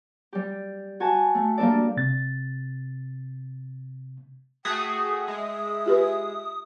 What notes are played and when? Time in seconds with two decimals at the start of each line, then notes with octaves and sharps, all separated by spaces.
0.33 G3 G4
1.00 F#4 G#5 A5
1.35 A3
1.58 G3 A#3 D4 A4 D5
1.97 C3 A6
4.65 A3 F#4 G#4 G5 D#6
5.28 G#3 E5
5.86 F4 G4 B4